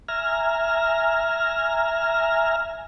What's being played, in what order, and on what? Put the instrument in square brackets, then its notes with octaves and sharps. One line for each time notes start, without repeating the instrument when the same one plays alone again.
[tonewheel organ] E5 G#5 A#5 F6